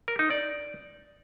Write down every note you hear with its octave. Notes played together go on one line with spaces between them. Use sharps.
A#4
D#4
D5